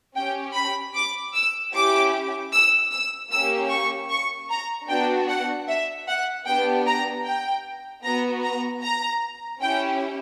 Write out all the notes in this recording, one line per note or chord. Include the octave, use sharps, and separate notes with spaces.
C#4 G4 G5
B5
D6
E6
C#4 E4 G4 D6
E6
E6
A#3 C#4 G4 E6
C#6
C#6
A#5
B3 D4 F#4 G5
F#5
E5
F#5
B3 D4 G4 G5
A#5
G5
B3 F#4 A#5
A#5
A#5
C#4 E4 G4 G5